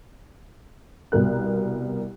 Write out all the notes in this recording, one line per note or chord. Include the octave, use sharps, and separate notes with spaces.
C2 B2 A#4 F#6